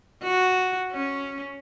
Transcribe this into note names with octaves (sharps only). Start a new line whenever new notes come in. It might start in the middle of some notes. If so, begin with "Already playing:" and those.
F#4
C#4